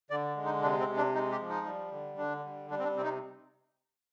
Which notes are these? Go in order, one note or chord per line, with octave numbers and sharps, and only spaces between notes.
D3 D5
G#3
D#4
C3 D4
C4
C3
D4
G#3 D#4
G4
F3
D#4
G3
D3
D3 D4
G3
G3 D4
C4
D4
C3 C4
D#4